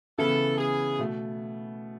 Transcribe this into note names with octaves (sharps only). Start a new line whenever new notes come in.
C#3 E3 B3 E4 A4
G#4
B2 A3